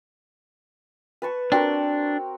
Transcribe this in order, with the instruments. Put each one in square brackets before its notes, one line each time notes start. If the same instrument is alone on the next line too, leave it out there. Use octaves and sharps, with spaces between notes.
[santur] B4 A5 C#6
[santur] C4 F#4 A#4 [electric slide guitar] D4